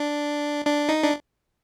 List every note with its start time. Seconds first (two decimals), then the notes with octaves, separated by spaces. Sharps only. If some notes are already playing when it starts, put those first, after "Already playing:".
Already playing: D4
0.65 D4
0.89 D#4
1.02 D4